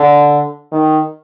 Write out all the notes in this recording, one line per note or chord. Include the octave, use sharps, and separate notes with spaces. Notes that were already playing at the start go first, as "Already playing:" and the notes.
Already playing: D3
D#3